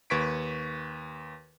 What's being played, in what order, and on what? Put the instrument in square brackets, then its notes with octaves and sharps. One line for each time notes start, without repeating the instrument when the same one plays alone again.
[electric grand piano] D#2 B4 C#6 G#6 B6 D7